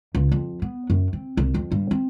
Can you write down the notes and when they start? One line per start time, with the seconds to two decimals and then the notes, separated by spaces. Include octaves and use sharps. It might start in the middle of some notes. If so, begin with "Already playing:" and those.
0.15 C#2
0.32 F2
0.62 B3
0.90 F#2
1.13 C4
1.37 C2
1.54 F2
1.72 G2
1.91 C4